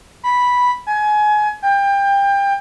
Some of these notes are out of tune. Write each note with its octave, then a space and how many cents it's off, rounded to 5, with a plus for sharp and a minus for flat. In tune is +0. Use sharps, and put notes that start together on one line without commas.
B5 -5
G#5 +25
G5 +25